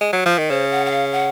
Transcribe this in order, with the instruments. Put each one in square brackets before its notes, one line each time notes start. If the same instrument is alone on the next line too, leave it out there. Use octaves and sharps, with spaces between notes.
[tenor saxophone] G#3
F#3
F3
D#3
[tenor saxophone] C#3 [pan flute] C5
[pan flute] F#5
F#5
F5
F#5